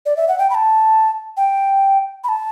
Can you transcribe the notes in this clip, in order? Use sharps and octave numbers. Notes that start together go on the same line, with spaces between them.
D5
E5
F#5
G5
B5
A5
G5
B5
A5